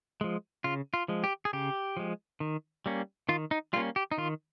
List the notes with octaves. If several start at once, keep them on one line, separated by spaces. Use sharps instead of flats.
F3 G#3
C#3 F4
F4
F3 G#3
G4
G#4
C#3 G4
F3 G#3
D#3
G3 A#3 C#4
D#3 F4
D#4
G3 A#3 C#4 F4
G4
D#4
D#3 F4